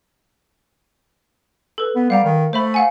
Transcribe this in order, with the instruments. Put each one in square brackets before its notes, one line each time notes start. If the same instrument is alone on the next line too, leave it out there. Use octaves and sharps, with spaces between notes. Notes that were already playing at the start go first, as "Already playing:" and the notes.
[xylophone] A4 B4
[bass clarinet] B3
[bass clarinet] G3 [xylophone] F5 F#5 A#5
[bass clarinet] D#3
[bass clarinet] A3 [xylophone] C5 E5 B5
[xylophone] F5 F#5 G#5